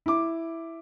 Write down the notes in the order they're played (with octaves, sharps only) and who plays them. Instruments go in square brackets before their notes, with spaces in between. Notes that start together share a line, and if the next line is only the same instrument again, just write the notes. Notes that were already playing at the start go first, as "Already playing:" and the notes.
[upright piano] E4 D6